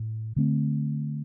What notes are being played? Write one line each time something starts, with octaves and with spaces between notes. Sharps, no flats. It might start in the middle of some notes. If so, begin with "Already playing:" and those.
Already playing: A2
D3 A3 C4